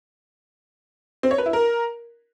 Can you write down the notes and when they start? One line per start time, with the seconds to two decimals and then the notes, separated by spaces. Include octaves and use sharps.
1.23 C4
1.31 C#5
1.38 B4
1.46 E4
1.53 A#4